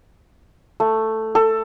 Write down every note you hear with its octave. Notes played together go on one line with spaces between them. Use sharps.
A3
A4